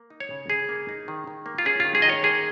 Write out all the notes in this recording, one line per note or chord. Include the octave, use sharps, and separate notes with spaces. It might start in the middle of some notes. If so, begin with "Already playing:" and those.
Already playing: A#3
D#4
C#5
C#3
C#3 G#4
A#3
D#4
D#3
D#3
A#3
F4
C#4 G#4
D#3 F4
G#4
D#3 D#5
C#5
A#3 G#4